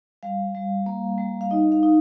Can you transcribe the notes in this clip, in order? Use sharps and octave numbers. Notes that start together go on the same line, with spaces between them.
G3 F5
G3
A#3
G3
F5
D#4 D#5
F5
D#4